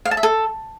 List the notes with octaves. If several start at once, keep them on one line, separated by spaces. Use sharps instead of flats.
F5
A5
E5
A4